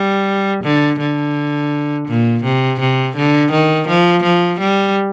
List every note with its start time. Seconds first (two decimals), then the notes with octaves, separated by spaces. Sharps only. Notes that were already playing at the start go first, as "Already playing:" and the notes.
Already playing: G3
0.64 D3
1.00 D3
2.08 A#2
2.44 C3
2.80 C3
3.16 D3
3.51 D#3
3.88 F3
4.23 F3
4.60 G3